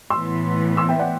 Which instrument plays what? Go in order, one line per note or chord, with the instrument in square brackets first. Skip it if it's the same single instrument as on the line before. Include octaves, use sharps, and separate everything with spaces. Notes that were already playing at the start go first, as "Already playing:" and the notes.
[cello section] A2 E3 B3 [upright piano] C6 E6
[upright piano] C6 E6
E5 G5
D5 F#5